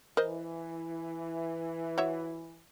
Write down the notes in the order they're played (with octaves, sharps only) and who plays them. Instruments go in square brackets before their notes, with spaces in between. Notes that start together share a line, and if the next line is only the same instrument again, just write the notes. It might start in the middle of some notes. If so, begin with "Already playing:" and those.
[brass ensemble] E3 [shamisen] A#4 C5 D#5
[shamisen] F#4 C#5 E5